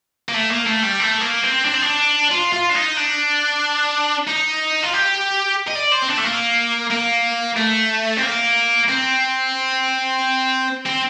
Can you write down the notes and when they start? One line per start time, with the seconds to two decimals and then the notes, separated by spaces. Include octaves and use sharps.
0.29 A#3
0.34 A3
0.51 A#3
0.67 A3
0.83 G3
1.00 A3
1.21 A#3
1.44 C4
1.65 D4
1.74 C4
1.82 D4
2.31 F4
2.53 F4
2.69 D4
2.75 D#4
2.97 D4
4.28 D#4
4.83 F4
4.94 G4
5.68 D#5
5.76 D5
5.92 C5
6.03 C4
6.09 D4
6.18 A3
6.25 A#3
6.91 A#3
7.57 A3
8.17 C4
8.22 A#3
8.89 C4
10.86 C4